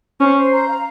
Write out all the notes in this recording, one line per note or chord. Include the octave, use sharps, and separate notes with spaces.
C#4 C5
C5
A#5
F5